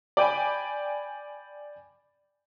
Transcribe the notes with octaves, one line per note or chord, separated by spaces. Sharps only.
D5 G5 G#5 B5